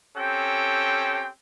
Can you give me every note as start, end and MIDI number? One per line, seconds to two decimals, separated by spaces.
0.17 1.28 60
0.17 1.28 61
0.17 1.28 67
0.17 1.28 69
0.17 1.28 79